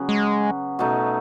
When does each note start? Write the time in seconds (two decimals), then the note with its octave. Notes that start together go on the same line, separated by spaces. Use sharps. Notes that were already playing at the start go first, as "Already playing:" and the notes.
Already playing: C#3 F#3 B3
0.09 G#3
0.79 B2 A3 D#4